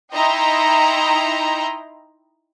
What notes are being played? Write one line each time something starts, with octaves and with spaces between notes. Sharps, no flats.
D#4 E4 D#5 G5 A#5 C6